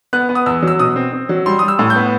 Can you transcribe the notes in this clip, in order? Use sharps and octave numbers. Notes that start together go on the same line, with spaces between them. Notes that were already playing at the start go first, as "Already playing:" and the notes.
B3 F#6
B3
D#6
E2 E6
F#3 E6
B2 D#6
C4
C4
F#3
G3 C6
G3 D#6
E6
A2
G6
B3